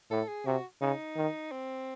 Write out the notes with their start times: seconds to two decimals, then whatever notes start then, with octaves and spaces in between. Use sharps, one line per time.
0.11 A2 A4
0.28 G#4
0.46 C3 F#4
0.81 C#3 D#4
1.17 D#3
1.51 C4